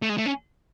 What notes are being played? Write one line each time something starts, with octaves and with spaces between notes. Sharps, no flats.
A3
G#3
A3
C#4